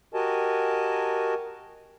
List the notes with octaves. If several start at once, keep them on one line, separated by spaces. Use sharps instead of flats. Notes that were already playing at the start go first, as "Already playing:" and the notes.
F#4 G4 A#4 D#5 G#5 A5